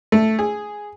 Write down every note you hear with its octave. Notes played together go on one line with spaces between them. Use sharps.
A3
G#4